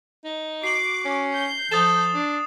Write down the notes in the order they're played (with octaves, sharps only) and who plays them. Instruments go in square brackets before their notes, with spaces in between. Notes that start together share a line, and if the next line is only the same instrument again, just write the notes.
[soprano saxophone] D#4
[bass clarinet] F#4 [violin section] D6 [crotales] C7 F#7
[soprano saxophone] C#4
[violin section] G6
[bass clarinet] F3 [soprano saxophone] A4 [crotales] D#6 A6 E7
[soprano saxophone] D4